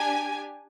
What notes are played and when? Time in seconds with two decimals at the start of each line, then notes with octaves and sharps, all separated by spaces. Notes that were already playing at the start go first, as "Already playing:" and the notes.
Already playing: D4 G4 G#5